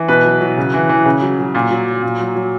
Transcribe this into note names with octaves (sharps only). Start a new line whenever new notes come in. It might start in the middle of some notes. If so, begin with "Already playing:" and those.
Already playing: E3
B2 B4
F#3
F#3
C#3
E3
E3
C#3
F#3
F#3
A#2
F#3
F#3
A#2
F#3
F#3